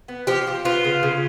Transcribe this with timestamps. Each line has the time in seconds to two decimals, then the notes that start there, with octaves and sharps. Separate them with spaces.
0.08 B3
0.27 F3 G4
0.47 F3
0.65 B3 F4
0.84 C#3
1.03 C#3